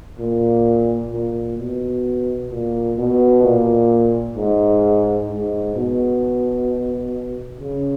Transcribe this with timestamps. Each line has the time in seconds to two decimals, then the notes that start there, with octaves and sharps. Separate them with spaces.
0.19 A#2
1.12 A#2
1.58 B2
2.50 A#2
2.97 B2
3.43 A#2
4.36 G#2
5.29 G#2
5.76 B2
7.60 C#3